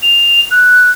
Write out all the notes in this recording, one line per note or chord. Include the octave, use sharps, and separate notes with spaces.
F7
F#6